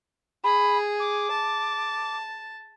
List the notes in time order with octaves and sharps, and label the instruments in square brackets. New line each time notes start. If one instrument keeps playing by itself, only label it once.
[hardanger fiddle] G#4 [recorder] B5
[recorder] D6
[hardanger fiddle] A5